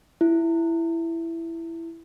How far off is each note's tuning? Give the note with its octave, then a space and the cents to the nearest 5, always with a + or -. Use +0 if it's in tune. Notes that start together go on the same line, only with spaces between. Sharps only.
E4 +10